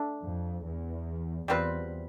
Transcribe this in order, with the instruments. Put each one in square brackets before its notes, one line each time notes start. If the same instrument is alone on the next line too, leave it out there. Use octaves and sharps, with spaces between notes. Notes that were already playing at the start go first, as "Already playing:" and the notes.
Already playing: [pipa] A3 D4
[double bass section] F2
E2
[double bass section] E2 [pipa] G3 C4 F4 B4